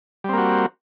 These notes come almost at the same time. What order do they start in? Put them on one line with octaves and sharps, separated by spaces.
G3 C4 A#3 F#4